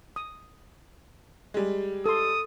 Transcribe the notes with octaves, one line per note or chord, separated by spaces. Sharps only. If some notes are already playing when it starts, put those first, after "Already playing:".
D#6
G3 G#3
A4 C6 D#6